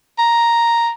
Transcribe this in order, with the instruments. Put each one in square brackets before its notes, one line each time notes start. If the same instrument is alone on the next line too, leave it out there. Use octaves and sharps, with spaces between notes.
[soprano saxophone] A#5